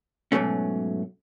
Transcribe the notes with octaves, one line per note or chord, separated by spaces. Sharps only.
G#2 B2 E3 F#3 A3 C#4